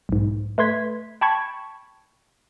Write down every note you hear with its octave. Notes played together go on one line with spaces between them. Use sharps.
B1 G#2
A3 B4 C6 G#6 B6
G5 A5 B5 C#6 G#6